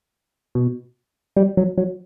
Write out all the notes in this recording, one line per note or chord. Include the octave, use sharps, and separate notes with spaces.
B2
G3
F#3
F#3